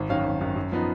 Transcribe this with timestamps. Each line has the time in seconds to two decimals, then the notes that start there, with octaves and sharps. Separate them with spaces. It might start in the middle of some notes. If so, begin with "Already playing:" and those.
Already playing: G#1
0.09 F#2 D#3 C#5 F5
0.25 G#1
0.41 F#2 D#3
0.56 F#2
0.72 F3 B3 D#4